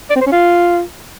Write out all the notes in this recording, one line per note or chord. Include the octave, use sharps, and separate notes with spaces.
D5
C4
C5
C#4
F4